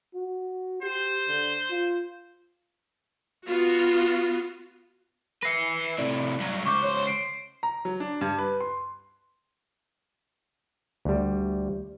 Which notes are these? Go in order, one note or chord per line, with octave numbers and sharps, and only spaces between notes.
F#4
G4 C5
D3
F4
B3 F4 F#4
B4 E5 A#6 C7 C#7
A2 C3 D5
G2 F#3
C#2 C5 C#6 D6 G6
C#5
C7 D7
A#5
F#3
D4
G2
B4
C6
D2 G3